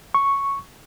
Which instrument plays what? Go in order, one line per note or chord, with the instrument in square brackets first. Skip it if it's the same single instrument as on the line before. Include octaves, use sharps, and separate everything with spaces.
[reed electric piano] C#6